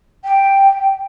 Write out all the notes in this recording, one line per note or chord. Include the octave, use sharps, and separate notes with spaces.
G5